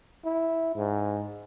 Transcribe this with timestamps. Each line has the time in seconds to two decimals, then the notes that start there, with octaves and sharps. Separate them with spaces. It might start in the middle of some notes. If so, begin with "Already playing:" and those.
0.25 E4
0.75 G#2